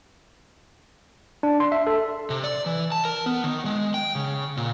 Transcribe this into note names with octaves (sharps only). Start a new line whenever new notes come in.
D4
C6
E5
A4
C3
D5
E3
A5
A#4
B3
D#3
G#3
G5
C#3
A#2